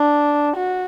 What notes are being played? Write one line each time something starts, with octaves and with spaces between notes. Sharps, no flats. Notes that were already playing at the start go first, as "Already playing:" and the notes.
Already playing: D4
F#4